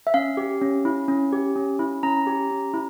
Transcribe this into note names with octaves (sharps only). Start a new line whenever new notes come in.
E5
C#4 F5
G4
C#4
E4
C#4
G4
C#4
E4
C#4 A#5
G4
C#4
E4